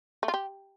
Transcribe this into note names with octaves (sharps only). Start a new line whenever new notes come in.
A3
F4
G4